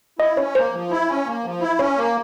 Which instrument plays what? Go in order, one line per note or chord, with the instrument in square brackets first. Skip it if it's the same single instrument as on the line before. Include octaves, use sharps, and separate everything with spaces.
[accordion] E4 [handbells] D#5
[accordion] C#4 [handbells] C#5
[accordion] A#3 [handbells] C5
[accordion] F3
E4
C#4
A#3
F3
E4
[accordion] C#4 [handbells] C#5
[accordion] A#3